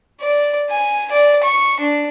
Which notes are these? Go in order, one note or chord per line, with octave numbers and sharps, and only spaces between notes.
D5
G#5
D5
C#6
D4